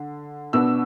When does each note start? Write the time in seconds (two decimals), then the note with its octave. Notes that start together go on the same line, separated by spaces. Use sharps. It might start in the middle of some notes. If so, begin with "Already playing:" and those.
Already playing: D3
0.53 B2 B3 D4 E6